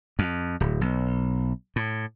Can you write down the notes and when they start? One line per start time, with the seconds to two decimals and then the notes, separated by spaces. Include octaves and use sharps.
0.19 F2
0.60 D1
0.81 B1
1.76 A2